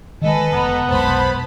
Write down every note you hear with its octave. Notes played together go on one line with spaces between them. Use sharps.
D#3 E3 G#3 A4 B4 D#5 G#5
F1 B3 A#5
F1 B1 G#3 C5 A5 B5